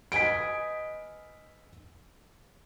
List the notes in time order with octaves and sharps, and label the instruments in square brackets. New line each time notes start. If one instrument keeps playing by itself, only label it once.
[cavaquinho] B4 D#5 G#5 [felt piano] B6 D7